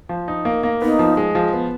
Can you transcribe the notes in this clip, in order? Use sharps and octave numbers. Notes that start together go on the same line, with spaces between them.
F3
D#4
A#3
A#3
B3 D#4
F3
G#3
F3
B3